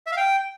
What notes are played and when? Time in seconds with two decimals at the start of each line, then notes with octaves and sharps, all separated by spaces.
0.07 E5
0.12 F5
0.17 G5